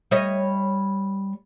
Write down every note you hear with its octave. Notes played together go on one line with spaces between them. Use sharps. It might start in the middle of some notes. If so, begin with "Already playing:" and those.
G3 C#5 D#5